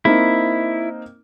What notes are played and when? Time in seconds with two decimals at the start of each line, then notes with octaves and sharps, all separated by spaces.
0.05 A#3 C4 D#4 E4